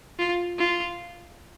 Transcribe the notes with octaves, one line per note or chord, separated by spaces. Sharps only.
F4
F4